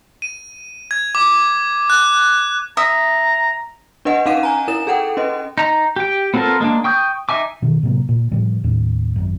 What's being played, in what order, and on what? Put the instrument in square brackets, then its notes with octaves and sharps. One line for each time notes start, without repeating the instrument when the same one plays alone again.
[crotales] D#7
G#6
D6
F#6
[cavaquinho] E5 D#6 [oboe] A#5
[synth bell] D4 B4 D#5 F#5
C#4 D#4 F5 F#5 D#7
G#5 A#5
E4 A#4 E7
G#4 A4 F#5 G5
C#4 B4 D#5
[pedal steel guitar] D#4 A#5
G4 G5
B3 C4 F4 A4 A#4
G#3 A#3 D4
G5 C#6 D#6 G6
D#4 E5 G#5 D6
[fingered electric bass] B2 D#3
A2 C3 F#3 A#3
A#2
A2 C#3 F3 G3
D#2 A2
G#1 F#2